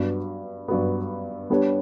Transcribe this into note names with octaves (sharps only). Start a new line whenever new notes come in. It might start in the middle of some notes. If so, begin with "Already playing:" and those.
Already playing: G2 F#3 B3
G2 F#3 B3
G3 B3 D4 G4 C#5